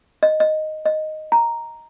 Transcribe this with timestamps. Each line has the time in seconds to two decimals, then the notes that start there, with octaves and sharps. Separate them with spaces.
0.23 D#5
0.40 D#5
0.86 D#5
1.32 A#5